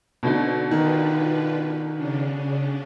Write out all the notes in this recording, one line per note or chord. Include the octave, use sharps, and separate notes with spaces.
B2 D3 C4 D#4
D#3 D4 F4 B4
C#3 C#4 D4